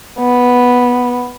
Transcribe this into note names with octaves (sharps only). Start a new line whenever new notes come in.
B3